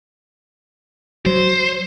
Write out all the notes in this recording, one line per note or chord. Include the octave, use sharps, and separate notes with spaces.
F#3 C5